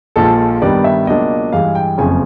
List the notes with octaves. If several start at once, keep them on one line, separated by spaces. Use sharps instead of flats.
A#1 A#2 F3 G#3 A4
G2 D#3 G3 B3 D4 D5
E5
C#2 B2 F#3 A#3 D4 D#5
G2 E3 G#3 F5
G5
F#1 F2 C#3 G#5